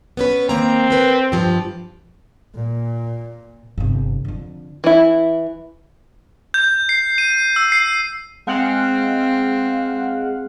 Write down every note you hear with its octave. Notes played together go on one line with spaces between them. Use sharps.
B3 C#4 B4
D#3 A#3 C4 A#5
A#4 B4
G2 F3 G4
A#2
G1 C3
F2 D3
E3 E4
G6
C7
D#7
E6
C7
G#3 C4 F5 F#5